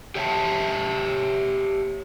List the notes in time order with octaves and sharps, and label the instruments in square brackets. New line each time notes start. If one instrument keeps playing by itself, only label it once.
[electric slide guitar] G4 C#5 E5 F#5 A5